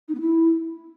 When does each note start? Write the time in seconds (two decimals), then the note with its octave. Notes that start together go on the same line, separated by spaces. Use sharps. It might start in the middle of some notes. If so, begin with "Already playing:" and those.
0.08 D#4
0.14 B3
0.20 E4